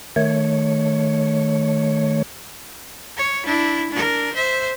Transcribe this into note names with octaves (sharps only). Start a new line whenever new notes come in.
D#3 A3 C#5
C#5
D4 E4
D4 A#4
C5 E5